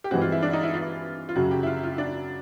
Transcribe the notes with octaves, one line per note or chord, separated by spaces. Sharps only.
G4
G2 E3 G#3 C4 F#4
F4
E4
D4
D#4
E4
F4
F4
F#2 C#3 F#3 F#4
G4
E4
F4
F4
D4